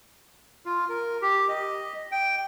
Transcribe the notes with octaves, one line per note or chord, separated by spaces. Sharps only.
F4
A#4
G4
D#5
G5